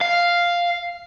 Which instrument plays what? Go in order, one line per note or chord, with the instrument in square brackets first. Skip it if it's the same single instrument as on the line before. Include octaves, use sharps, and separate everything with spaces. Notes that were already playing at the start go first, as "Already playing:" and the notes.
[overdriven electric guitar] F5